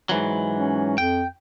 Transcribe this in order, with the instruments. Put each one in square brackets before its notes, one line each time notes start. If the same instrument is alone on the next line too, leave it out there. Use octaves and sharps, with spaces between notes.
[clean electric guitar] G#2 E3 F#3
[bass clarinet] C#4
[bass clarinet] F2 [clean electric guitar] G5